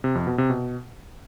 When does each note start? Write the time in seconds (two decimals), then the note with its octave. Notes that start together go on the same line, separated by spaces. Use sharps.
0.04 C3
0.15 F2
0.27 B2
0.38 C3
0.50 B2